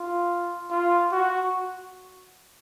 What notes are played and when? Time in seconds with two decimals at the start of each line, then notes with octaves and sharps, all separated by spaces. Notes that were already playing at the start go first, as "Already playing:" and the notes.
Already playing: F4
0.70 F4
1.12 F#4